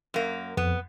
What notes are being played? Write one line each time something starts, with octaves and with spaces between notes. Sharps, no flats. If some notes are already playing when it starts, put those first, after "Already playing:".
F#2 A#3
F2 B3